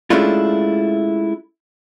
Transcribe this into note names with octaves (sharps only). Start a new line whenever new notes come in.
G#3 A3 C#4 D4 E4 F4